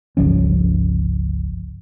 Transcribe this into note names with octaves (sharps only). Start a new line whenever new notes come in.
G1 C#2 F3 C#4